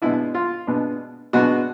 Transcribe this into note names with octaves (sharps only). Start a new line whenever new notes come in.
B2 G#3 B3 D4 E4
F4
B2 G#3 B3 D4
B2 G#3 B3 D4 F#4